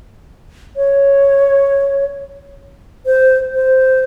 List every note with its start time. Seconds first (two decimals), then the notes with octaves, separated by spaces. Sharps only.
0.76 C#5
3.06 C5
3.52 C5